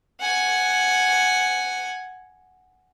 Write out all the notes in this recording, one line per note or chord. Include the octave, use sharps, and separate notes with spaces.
F#5 G#5